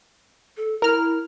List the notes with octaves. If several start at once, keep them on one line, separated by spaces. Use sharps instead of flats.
A4
E4 A#4 F6